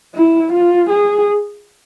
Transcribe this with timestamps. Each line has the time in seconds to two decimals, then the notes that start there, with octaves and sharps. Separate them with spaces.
0.15 E4
0.53 F4
0.90 G#4